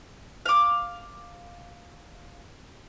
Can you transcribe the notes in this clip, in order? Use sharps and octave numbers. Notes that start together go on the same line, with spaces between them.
F5 D6